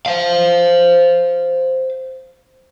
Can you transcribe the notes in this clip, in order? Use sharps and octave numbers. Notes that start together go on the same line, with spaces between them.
C5 F5